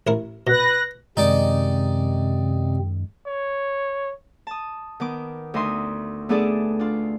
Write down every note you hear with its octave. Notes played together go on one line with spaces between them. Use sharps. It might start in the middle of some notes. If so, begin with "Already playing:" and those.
A1 E4 A#4
B2 B4 F#6 A#6
F#2 C3 D#3 G#3 C4 D#4 D5 D6
C#5
A5 D#6
D#3 B3 D6
D2 D#4 E5 C6 D#6
A3 B3 D4 G#4 A4 D5
D4 F4